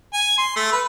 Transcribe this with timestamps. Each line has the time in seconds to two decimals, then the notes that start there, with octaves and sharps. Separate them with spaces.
0.14 G#5
0.38 C6
0.56 A3
0.72 B4